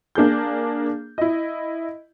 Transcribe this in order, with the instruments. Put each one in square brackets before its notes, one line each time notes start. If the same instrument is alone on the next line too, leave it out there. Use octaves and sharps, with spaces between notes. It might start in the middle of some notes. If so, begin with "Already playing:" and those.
[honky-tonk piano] A#3 D4 G#4 G6
E4 D#5